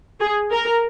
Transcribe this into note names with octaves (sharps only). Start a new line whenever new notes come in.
G#4
A#4